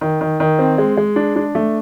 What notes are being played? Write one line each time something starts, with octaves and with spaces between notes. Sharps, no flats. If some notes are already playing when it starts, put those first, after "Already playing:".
D#3
D#3
D#3
C4
G#3
G#3
D4
D4
A3